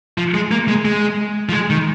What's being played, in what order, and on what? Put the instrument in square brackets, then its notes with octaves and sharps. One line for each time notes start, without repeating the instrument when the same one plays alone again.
[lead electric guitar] F3
G#3
A#3
G#3
G#3
F3
G#3
D#3